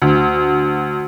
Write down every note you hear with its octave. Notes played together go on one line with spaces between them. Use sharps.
D2